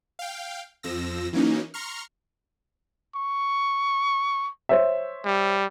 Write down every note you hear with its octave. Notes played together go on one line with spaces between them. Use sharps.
F5 G5
F2 F3 E6 A#6
E3 F#3 A#3 C#4 D#4
A#5 C6 C#6 F6
C#6
C5 C#5 E5
G3